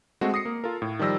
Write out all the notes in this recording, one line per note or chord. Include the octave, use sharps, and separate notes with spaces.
G#3 A3 C4 F#4
D#6 A#6 C7 C#7
A#3
F4 A4 A#4
A2
D#3 F3 G3 E6 A#6